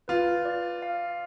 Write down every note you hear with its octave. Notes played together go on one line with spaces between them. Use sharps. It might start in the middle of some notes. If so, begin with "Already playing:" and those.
F4 B4
D5
F5